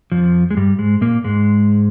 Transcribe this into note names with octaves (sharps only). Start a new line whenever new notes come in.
F2 F3
G#3
G2 G3
G#2 G#3
A#2 A#3
G#2 G#3